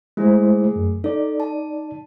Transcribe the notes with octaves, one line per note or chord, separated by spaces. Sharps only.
G#3 A3 E4 G#4 C5
F#2
D#4 A4 D5
A5